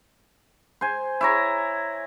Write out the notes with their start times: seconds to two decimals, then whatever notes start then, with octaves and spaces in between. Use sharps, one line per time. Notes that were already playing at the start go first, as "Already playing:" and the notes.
0.81 C5 G#5
1.21 E4 C#5 A#5